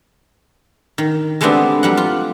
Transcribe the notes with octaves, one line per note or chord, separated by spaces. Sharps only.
D#3
G#3 A3 B3 C4 D4 G4
F#3 G3 F#5
F4